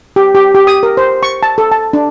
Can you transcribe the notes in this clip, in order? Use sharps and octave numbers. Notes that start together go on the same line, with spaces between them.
G4
G4
G4
D#6
A#4
C5
C#6
A5
A4
A5
D4